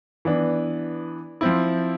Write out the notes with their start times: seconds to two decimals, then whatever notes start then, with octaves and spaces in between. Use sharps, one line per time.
0.25 E3 B3 D4
1.41 F3 C4 E4